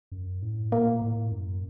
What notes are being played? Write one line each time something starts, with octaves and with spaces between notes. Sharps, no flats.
F#2
A2
A#2 A#3
A2
F#2